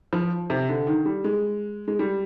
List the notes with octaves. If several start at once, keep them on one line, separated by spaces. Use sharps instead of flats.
F3
C3
D3
D#3
G3
G#3
G#3
G3